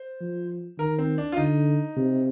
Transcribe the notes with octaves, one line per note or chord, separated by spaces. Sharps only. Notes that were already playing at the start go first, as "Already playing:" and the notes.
Already playing: C5
F3
D#3 A#4
C4
D4
F4
D3 D#4
C3